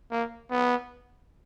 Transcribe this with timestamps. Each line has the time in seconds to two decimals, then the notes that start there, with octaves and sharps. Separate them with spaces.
0.11 A#3
0.51 B3